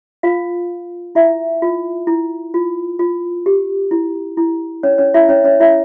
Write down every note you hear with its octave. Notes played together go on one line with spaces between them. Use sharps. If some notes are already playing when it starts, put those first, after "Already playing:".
F4 F5
E4 E5
F4
E4
F4
F4
G4
E4
E4
C#4 C#5
C#4 C#5
E4 E5
C#4 C#5
C#4 C#5
E4 E5